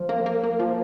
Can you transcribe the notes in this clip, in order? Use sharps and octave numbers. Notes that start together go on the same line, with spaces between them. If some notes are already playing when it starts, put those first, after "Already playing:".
Already playing: F3
A#3
A#3
A#3
F3